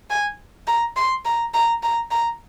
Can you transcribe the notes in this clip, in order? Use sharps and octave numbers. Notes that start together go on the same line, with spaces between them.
G#5
A#5
C6
A#5
A#5
A#5
A#5